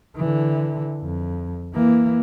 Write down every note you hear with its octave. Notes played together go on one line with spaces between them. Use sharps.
D3 E3
F2
E3 A#3